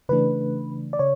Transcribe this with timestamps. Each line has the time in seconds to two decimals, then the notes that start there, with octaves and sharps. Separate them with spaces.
0.09 C#3 E3 A3 D4 B4
0.93 D5
0.99 C#3 C#5